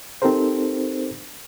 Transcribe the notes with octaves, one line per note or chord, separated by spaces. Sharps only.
C4 D#4 G4 A4 A#4 C5